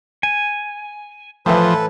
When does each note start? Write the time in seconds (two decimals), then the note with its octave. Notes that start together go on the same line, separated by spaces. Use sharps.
0.23 G#5
1.46 A2 E3 F3 A4 B4